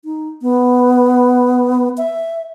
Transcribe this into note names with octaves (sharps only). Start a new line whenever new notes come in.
D#4
B3
E5